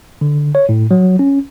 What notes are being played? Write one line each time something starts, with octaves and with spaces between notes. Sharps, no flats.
D3
C#5
A2
F#3
C#4